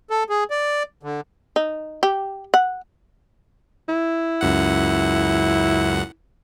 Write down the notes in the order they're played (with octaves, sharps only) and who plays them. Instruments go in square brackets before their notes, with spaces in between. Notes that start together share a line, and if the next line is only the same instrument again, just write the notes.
[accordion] A4
G#4
D5
D3
[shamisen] D#4
G4
F#5
[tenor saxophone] E4
[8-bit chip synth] C#2 F#2 F#5